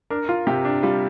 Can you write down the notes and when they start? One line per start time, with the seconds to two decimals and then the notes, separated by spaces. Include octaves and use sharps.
0.10 D4 A#4
0.29 F4
0.47 C3 G4
0.65 D4
0.83 G3 F4